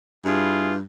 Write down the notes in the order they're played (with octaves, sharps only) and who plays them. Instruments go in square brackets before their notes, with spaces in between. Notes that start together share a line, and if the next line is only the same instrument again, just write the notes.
[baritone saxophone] G2 [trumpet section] E4 F4 G#4